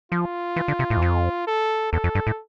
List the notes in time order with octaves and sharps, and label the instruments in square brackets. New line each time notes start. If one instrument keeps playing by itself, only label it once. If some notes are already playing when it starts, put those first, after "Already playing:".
[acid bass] F3 [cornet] F4
[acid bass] E3
D3
C3
A2
E2
F2
[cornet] A4
[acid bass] E2 [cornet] A4
[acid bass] F2
G2
A2